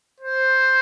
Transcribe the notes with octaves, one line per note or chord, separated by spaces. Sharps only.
C5